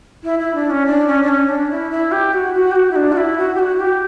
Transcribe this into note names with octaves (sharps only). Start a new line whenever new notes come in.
E4
E4
D4
C#4
D4
C#4
D4
C#4
D4
E4
E4
G4
F#4
F#4
G4
F#4
E4
D4
F#4
E4
F#4
G4
F#4
G4